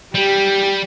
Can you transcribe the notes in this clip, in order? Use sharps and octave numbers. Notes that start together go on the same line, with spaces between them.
G3 G4